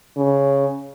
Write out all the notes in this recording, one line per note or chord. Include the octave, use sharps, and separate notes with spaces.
C#3